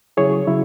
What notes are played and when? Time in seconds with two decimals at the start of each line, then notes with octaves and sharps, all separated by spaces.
0.17 C#3 F#3 E4 G#4 C#5
0.47 C#3 F#3 E4